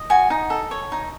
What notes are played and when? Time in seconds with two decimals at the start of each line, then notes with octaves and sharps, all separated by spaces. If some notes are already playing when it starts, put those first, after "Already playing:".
Already playing: D#5
0.10 F#4 G#5
0.30 D#4
0.50 A4
0.71 C#5
0.92 D#4